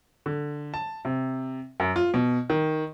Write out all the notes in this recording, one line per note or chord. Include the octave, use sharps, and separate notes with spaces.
D3
A5
C3
F#2
F4
B2
D#3